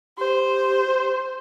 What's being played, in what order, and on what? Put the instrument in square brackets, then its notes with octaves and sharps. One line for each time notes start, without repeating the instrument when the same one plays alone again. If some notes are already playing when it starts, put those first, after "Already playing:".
[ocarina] G4 [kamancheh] C5